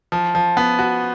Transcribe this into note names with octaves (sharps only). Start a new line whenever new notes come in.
F3
F3
B3
F#4